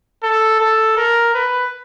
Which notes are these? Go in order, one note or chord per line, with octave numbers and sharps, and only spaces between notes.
A4
A4
A#4
B4